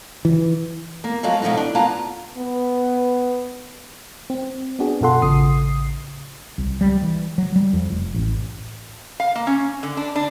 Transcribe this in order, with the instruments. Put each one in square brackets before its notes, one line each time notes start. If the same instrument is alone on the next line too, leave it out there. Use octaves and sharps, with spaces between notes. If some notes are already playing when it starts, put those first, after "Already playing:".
[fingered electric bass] E3
[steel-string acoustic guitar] A#3
F3 F#3 G#3 F4 A4
B2 F3 A3 C4 D#4
D4
A#3 B3 F4 F#5 A5 A#5
[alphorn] B3
[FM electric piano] C4
B3 D4 F#4 G#4
F#2 B2 F4 A4 F#5 C6
A1 C#3 D#6 C7
[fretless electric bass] C2
G3
E3
F#3
G3
F2
F1
A1
[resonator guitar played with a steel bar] F5
A#3
C#4
D3
D4
D4